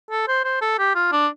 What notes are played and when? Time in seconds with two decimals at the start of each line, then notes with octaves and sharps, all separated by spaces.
0.11 A4
0.28 C5
0.44 C5
0.61 A4
0.79 G4
0.95 F4
1.12 D4